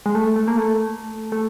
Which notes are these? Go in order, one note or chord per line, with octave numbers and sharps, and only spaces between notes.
G#3
A3
A3
A#3
A3
A3